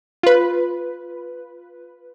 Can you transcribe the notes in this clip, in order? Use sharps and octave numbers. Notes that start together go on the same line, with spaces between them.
F4 B4